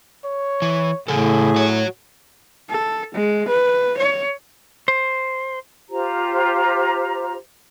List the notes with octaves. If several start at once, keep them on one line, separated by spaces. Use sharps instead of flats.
C#5
E3
A2 C#3 G#4 A4
F#4 C#5
A4
G#3
B4
C#5
C5
F4 G4 C5 A#5